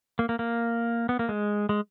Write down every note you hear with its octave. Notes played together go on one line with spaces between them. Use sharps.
A#3
A#3
A#3
B3
A#3
G#3
G#3